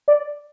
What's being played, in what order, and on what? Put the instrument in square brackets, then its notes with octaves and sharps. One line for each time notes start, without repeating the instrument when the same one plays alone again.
[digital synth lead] D5